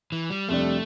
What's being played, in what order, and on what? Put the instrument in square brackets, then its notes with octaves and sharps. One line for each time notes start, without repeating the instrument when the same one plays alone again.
[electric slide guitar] E3
G3
[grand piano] F2 C3 G3 D4 [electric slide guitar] A3